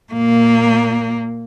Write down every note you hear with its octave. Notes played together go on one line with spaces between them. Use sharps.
A#2 A#3